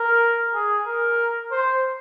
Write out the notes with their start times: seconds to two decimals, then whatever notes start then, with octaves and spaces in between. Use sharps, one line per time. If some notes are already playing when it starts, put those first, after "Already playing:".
Already playing: A#4
0.55 G#4
0.87 A#4
1.52 C5